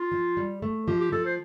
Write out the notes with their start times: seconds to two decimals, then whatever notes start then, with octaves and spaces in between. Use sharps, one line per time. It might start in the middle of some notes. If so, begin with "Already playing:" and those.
Already playing: F4
0.12 F3
0.37 G3
0.62 A3
0.87 F3 G4
1.00 G4
1.12 F3 A4
1.25 C5